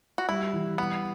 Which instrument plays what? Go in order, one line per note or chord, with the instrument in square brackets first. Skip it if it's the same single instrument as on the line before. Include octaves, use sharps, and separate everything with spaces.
[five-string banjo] F#4
[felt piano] G3 [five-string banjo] E4
[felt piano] E3
[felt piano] G3 [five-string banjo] B3